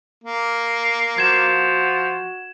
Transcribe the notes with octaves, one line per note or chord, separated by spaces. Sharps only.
A#3
F3 F#4 G#6 E7